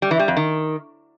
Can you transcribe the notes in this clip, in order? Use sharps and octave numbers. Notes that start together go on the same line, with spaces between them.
G3
E3
G3
F2
D#3